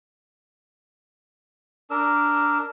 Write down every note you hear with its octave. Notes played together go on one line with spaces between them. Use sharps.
D4 A#4 E6